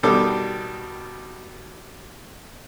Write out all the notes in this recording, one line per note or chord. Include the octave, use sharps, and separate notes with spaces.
B2 D#3 G3 A4 D6